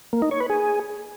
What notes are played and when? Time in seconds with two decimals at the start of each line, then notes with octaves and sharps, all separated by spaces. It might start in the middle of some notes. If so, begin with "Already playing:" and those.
0.13 A#3
0.22 D#4
0.31 C#5
0.40 B4
0.50 G#4